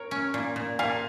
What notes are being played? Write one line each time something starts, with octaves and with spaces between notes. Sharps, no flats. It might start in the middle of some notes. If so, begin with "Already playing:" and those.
Already playing: A#4 C#5
C#4
A#2
A#2
A#2 F5 G#5